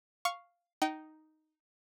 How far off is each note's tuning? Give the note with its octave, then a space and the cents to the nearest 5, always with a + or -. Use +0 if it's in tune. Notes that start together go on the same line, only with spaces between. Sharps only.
F5 +0 C#6 +0
D#4 +0 G5 -30